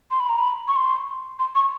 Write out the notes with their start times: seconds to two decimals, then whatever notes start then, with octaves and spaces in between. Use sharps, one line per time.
0.11 C6
0.20 B5
0.29 A#5
0.38 B5
0.68 C#6
0.76 C6
1.39 C6
1.55 C#6